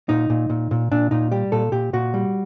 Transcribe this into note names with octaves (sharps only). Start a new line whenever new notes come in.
A#2 D#4
A#2
A#2
A#2
A#2 D4
A#2 D#4
G3 G4
A#2 A4
A#2 G4
A#2 F#4
G3